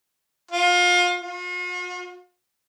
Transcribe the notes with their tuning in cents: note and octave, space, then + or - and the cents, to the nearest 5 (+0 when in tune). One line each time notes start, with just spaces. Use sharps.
F4 +30
F4 +45